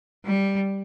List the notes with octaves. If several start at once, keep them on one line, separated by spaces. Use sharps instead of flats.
G3